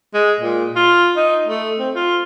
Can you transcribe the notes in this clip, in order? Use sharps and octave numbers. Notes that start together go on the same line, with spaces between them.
G#3
A#2
F4
D#4
A3
C4
F4